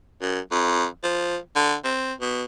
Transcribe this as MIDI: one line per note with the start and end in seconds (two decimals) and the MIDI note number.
0.21 0.40 42
0.51 0.85 41
1.03 1.37 53
1.56 1.75 50
1.84 2.13 60
2.21 2.45 47